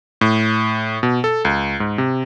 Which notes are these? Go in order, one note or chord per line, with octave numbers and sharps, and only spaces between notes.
A2
B2
A4
C#2
G#2
C3